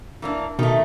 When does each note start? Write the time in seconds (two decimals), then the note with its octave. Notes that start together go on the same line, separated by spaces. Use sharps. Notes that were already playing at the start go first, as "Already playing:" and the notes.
0.22 E3 A#3 D4
0.59 B2 D#3 A3